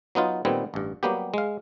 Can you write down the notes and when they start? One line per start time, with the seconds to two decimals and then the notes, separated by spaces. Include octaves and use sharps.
0.15 F#3 B3 D#4 F4
0.45 A#2 D#3 G3 B3 C4
0.74 A1 G2
1.03 F#3 G3 A#3 B3 G4
1.34 G#3 F5